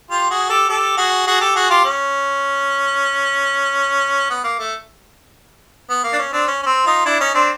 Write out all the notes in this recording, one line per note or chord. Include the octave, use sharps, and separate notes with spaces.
F4 G4
F#4 G#4
G4 A4
G4 A4
F#4 G#4
F#4 G#4
G4 A4
F#4 G#4
F4 G4
C#4
B3
A#3
A3
B3
A#3
D4
C#4
C4 D4
C#4
C#4
C4
D#4 F4
D4 E4
C#4 D#4
C4 D4